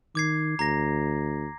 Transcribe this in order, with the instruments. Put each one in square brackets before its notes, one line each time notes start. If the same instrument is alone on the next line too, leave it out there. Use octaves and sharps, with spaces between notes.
[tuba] D#3 [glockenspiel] D6 G#6 C7
[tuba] D2 [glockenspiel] A#5 A#6